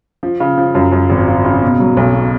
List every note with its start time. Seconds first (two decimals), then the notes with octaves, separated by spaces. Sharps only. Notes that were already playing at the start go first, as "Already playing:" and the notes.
0.23 F3
0.40 C#3
0.58 F3
0.75 F#2
0.92 F#2
1.10 G#1
1.28 C#3
1.45 C#3
1.63 B2
1.80 F#3
1.97 B1
2.15 B2